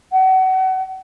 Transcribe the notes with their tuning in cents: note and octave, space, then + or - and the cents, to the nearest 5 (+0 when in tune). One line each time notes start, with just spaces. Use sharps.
F#5 +30